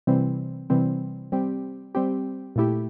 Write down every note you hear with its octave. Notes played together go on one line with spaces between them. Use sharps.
C3 E3 G3 C4
C3 E3 G3 C4
G3 C4 G4
G3 C4 G4
A#2 A3 E4 G4